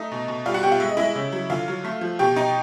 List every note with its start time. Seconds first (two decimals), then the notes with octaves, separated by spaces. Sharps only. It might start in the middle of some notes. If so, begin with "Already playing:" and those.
Already playing: A3 D#4 D#5
0.11 B2
0.28 B2
0.46 G3 F4 F5
0.54 F#4 F#5
0.63 B2 G4 G5
0.72 F4 F5
0.80 G#3 E5
0.89 D#5
0.97 G#3 E4 E5
1.16 C#3
1.32 F#3
1.50 D3 F4 F5
1.68 F#3
1.84 A3
2.01 F3
2.19 B2 G4 G5
2.36 B2 D#4 D#5